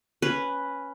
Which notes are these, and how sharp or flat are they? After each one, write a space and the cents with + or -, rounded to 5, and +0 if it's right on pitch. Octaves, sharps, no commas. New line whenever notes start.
C#4 +0 B4 +0